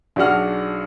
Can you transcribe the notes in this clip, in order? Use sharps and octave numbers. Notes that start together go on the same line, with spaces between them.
B1 D4 F#4 G#4 F#5 F6